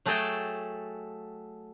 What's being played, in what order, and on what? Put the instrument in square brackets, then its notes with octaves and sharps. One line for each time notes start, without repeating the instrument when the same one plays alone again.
[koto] F#3 A3 F#4 G#4 A4 G5